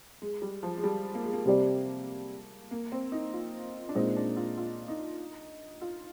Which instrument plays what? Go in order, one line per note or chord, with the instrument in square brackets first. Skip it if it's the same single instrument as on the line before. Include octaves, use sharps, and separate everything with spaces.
[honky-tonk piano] G#3
G3
F3
G#3
G3
A#3
G#3
A#3
[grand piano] C3 G3 C4 G4 D5
[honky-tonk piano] A#3
C4
D#4
F4
D4
[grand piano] A#2 G#3 C4 [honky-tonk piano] D#4
[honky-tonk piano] D4
F4
F4
D#4
F4